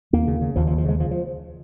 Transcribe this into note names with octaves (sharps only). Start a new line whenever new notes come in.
D#2 A#3
C#3
C#3
D#2 F3
F3
D#2
F3
C#3 G#3
C#3 F3
F3